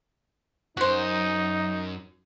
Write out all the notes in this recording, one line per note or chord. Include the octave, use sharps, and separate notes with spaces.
F#2 D#4 F#4 C5